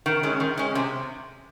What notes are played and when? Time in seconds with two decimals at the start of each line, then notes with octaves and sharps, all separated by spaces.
0.06 D#3
0.23 G#3 C#4
0.40 D#3
0.57 G#3 C#4
0.75 C3